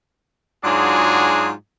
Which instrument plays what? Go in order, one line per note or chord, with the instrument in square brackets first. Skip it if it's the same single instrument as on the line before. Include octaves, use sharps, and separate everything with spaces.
[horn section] G#2 F#3 D4 F4 F#4 G#4